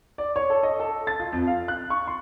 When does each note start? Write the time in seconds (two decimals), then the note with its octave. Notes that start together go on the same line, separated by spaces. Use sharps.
0.18 D5
0.36 C#5
0.50 A4
0.63 D#5
0.80 A4
1.07 A6
1.20 F4
1.32 F2
1.47 F5
1.68 F#6
1.90 C#6
2.08 C6